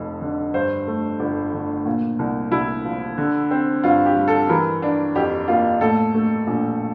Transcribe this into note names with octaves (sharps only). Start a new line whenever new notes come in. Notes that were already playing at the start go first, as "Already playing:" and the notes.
Already playing: F1 F2
D3
G2 C5
A3
G1
D3
A#2
C2
C2 E4
F3
D3
C4
G2 F4
G4
G3
A4
E3 A#4
D4
F2 G4
A#3 F4
A2 A4
A3
A#1